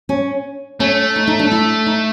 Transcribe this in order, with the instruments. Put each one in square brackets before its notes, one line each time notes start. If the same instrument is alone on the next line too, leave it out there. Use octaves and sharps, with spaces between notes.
[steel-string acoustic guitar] C#4
[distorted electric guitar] A3 [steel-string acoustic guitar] C#4
[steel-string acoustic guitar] D#4
D#4
D4
E4
D#4